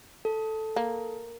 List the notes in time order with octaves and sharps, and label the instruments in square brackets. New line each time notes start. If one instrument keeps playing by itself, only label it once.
[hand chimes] A4
[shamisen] A#3